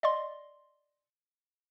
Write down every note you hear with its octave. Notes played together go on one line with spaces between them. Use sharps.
D5 D#5 C6